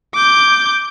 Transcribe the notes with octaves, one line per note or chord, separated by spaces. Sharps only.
D6 G6